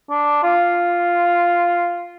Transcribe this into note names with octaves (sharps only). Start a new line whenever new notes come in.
D4
F4